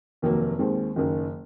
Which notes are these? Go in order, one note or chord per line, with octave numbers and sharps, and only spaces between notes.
F1 D#2 D#3 F#3 A#3
D#2 D#3 G#3 C4
F#1 F#2 D#3